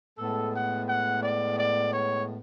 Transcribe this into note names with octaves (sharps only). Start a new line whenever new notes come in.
A2 G#3 B3 A4
F#5
F#5
D5
D5
C#5